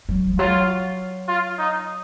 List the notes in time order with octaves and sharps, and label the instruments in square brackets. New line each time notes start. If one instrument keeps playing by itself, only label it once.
[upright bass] F#3
F3
[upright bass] F#3 [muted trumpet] F4
[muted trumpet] F4
D#4